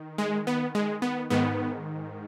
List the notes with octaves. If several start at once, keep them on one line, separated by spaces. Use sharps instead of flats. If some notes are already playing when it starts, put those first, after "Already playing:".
Already playing: D#3
G#3
B3
G#3
B3
G#2 D#3 B3